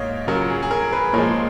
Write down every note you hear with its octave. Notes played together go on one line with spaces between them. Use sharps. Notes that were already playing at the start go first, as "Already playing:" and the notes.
Already playing: G#2 A#3 C#5 D#5 F5
C#3 F#3 C#4 F4 A#4
G#4
G#4
A#4
G#4 B4
A#2 F3 G#3 A#4 C#5